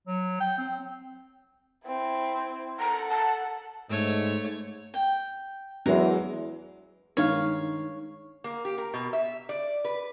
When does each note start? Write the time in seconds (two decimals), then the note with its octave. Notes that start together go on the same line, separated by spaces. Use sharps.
0.07 F#3
0.40 G5
0.58 C4
1.86 C4 E4
2.80 A4 F#5 A#5
3.10 A5
3.90 G#2 A3 C#5
4.94 G5
5.86 E2 F#3 G#3 A#4
7.17 G2 D#3 G#3 C#5 F5
8.44 A#3
8.65 G4
8.78 A#4
8.94 B2
9.13 E5
9.49 D5
9.85 B4